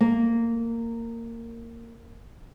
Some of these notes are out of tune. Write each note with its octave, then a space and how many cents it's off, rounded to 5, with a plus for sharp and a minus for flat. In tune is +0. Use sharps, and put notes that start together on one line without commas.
A#3 -15